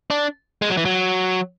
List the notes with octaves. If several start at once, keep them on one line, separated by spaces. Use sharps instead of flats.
D4
G#3
F#3
E3
F#3